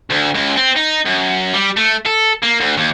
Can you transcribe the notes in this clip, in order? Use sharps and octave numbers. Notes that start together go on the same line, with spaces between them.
D2
C#2
C4
D#4
F#2
G3
A3
A4
A#3
D2
D#2